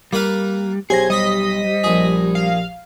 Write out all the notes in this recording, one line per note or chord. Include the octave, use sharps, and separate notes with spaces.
G3 A#3 B4 F5
B1 G4 G#4 C5 G#6 A#6
G3 D#5 D#6 B6
A#1 G#4
F5